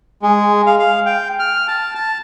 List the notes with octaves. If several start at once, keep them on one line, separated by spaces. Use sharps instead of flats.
G#3
F5
F5
G5
F6
A5
A5